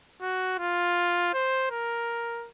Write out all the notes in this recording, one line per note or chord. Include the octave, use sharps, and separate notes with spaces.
F#4
F4
C5
A#4